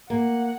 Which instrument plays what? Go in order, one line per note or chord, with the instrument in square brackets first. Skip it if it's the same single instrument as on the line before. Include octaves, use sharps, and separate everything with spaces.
[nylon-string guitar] A#3 [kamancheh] F#5